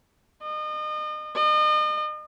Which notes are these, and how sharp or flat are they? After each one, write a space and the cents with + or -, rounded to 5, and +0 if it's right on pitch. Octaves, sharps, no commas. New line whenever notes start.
D#5 -35
D#5 -40